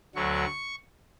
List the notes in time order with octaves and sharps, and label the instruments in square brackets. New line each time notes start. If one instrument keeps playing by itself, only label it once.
[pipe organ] D2 D3 F#3 C#6